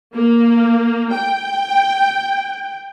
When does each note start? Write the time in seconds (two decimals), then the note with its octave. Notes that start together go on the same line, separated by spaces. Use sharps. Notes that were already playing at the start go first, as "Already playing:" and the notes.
0.14 A#3
1.12 G5